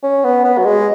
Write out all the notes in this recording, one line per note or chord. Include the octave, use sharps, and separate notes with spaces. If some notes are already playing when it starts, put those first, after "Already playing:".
C#4
B3
B3
F#3
G#3